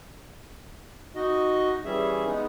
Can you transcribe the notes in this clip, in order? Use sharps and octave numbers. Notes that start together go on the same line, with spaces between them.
D#4 F#4 D#5
E3 G3 C#4 G#4 E5
G#3 B3 D#4